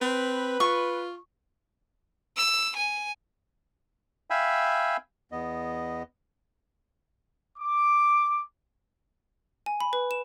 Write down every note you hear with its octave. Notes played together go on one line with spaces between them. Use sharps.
C4 B4
F4 C#6
E6
G#5
E5 F5 G5 G#5 B5 E6
E2 B3 D#5
D6
G#5
B5
B4
E7